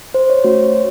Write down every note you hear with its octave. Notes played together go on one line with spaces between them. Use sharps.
C5
C#5
A3 C#4 F#4 C5
C#5